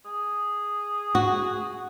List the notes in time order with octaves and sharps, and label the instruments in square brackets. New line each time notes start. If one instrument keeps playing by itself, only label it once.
[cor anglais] G#4
[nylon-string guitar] F#4